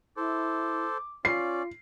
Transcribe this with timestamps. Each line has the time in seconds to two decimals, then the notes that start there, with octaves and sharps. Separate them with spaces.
0.17 E4 A4 C5 D6
1.25 C#4 F4 D5 C7